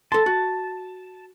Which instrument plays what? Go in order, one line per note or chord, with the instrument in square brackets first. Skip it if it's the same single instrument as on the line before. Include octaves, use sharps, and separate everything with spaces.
[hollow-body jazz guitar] A4 C6 [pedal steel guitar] A5
[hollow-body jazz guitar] F#4